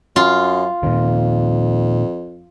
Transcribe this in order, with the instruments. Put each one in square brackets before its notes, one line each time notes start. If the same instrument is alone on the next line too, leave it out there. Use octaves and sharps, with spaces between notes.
[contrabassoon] F#2 [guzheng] F4
[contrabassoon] F2 [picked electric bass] A#2 D#3